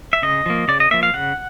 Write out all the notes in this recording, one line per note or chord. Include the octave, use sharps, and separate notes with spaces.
E5
C#3 D#5
F3 A#3
C#3 D5
D#5
F3 A#3 E5
F5
C#3 F#5